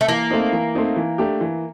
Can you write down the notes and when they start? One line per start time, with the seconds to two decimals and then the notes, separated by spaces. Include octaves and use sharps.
0.01 A3
0.08 E3 A#3
0.31 A3 C4 D#4
0.52 E3
0.75 A3 C4 D#4
0.96 E3
1.18 A3 D4 G4
1.41 E3